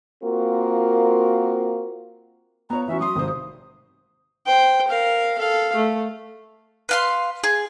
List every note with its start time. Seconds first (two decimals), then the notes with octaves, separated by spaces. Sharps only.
0.23 A#3 C4 F4 F#4 A#4
2.70 B3 F4 C#5 A#5
2.88 E3 C#4 F#4 E5
3.00 F#3 C6 D#6
3.16 G#1 C3 C5
4.46 C5 G5
4.88 A#4 F5
5.38 A4 F5
5.75 A3
6.89 B4 F5 C6
7.44 G#4